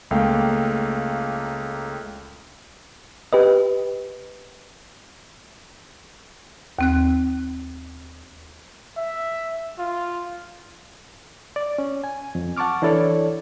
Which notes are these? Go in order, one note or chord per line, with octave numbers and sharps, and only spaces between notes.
C#2 A3 A#3 F5 G5
G4 B4 D#5
D#2 C4 F#6
E5
F4
D5
C#4
G#5
F2
F#5 A5 C#6 D6 F6
E3 D4 E4 A4 C#5 D5